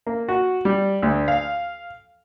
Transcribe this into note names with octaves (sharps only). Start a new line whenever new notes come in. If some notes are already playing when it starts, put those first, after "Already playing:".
A#3
F#4
G3
D2
F5